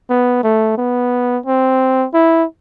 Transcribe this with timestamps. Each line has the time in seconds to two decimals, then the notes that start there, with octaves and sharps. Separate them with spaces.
0.10 B3
0.44 A3
0.78 B3
1.46 C4
2.14 E4